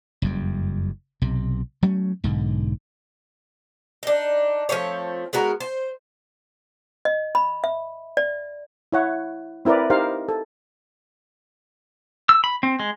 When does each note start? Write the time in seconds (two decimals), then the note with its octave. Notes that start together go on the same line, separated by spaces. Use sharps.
0.22 F#1 F2 G3
1.22 B1 C3
1.83 F#3 A3 C#4
2.24 B1 G#2 D3
4.03 D4 D#4
4.69 F3 A3 C4 C#5
5.33 G#3 B3 F#4 A#4
5.60 C5
7.05 D#5
7.35 B5
7.64 E5
8.17 D5
8.92 E4 C#5 F#5
9.65 C4 E4 A#4 B4 D5
9.90 D#4 G4 A#4 C5 F5
10.29 A4
12.29 E6
12.44 B5
12.63 C4
12.80 G#3